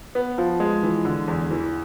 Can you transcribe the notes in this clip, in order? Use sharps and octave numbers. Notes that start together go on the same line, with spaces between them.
B3
F3
G#3
E3
D3
E2
E3